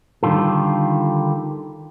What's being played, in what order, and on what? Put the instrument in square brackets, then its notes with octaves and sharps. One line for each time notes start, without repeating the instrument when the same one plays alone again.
[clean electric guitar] D3 D#3 G3 F4 A4